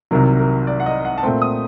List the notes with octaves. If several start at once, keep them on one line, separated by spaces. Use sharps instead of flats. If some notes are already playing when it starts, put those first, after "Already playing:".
C2 C3 D#3 F#3 A#4
A#4
D5
F#5
D#5
F#5
A5
A#2 A3 C4 G5
D#6